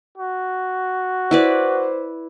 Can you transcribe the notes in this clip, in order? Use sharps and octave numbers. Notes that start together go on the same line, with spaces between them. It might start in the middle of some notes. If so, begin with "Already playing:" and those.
F#4
E4 B4 C5 D5